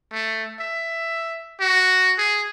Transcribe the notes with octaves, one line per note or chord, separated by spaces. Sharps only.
A3
E5
F#4
G#4